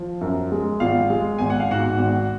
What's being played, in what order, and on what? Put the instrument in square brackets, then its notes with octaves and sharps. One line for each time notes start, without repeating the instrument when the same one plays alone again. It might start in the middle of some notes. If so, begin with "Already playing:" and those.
Already playing: [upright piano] F3
F#2
G#3
[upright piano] G#1 [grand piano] F4 F5
[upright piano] G#3
[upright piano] G#1 [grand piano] G#5
[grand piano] F#5
F5
[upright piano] G#2 [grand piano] F#4 F#5
[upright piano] G#1